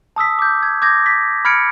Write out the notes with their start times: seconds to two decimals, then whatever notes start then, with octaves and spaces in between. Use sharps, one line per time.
0.16 A5 D#6 E6 B6
0.39 D6 G6
0.63 G#6
0.82 D6 G6 G#6 A#6
1.06 B6
1.45 B5 F6 G#6 C#7 D7